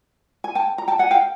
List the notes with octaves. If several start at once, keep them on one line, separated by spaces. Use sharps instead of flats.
G#5
G5 A5
A#5
G5 A5
F#5 G#5
F5 G5